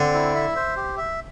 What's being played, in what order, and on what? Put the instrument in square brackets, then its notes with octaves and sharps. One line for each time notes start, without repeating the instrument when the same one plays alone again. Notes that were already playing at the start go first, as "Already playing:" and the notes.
Already playing: [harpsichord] D3 [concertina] C4
[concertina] E4
E5
C5
G4
E5